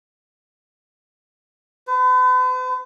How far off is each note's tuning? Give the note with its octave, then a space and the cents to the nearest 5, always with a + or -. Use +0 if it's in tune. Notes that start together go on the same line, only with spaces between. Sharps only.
B4 +45